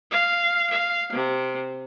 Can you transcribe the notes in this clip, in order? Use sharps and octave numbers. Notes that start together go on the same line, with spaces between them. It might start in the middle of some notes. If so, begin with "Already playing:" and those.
F5
F5
C3